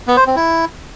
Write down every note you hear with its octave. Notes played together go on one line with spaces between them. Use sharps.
B3
C5
C4
E4